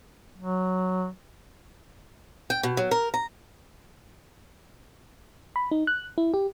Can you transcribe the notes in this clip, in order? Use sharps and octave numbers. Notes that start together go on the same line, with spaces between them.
F#3
G5
B2
F#3
A#4
A#5
B5
D#4
F#6
E4
G4